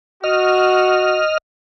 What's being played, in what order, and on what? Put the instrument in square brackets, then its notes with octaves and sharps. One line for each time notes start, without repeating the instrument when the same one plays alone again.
[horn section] F#4 [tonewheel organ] D#5 F6